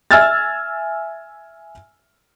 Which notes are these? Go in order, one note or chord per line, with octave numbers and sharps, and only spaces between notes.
E5 G#5 E6 F6 G#6 A6